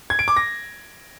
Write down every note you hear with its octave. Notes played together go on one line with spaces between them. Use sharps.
G#6
D7
D6
A#6